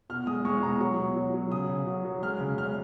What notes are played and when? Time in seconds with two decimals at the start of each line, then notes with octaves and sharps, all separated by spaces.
0.09 B2 F6
0.27 G#3 D#6
0.45 G#3 C#6
0.63 B2 A#5
0.80 F#3 C#6
0.98 B2
1.16 F#3
1.34 F#3
1.52 C#3 D#6
1.69 C#3
1.87 F#3
2.05 F#3
2.22 G#3 F6
2.40 C#3
2.58 G#3 F6